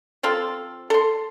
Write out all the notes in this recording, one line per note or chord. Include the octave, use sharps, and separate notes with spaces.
F3 C4 F4 A4
A4 C6